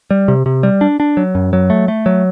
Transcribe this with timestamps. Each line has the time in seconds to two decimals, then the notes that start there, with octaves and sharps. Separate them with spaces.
0.11 G3
0.28 C3
0.46 C3
0.63 G3
0.81 D4
1.00 D4
1.17 F#3
1.35 F#2
1.53 F#3
1.70 A3
1.88 A3
2.06 F#3